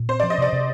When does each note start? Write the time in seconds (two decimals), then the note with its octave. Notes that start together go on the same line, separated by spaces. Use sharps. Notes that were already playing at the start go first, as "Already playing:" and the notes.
Already playing: A#2
0.09 C4 C5
0.20 D5
0.23 F3
0.30 D#5
0.38 C3 D5
0.52 C3